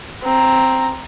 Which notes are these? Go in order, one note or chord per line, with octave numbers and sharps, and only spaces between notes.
C4 A#5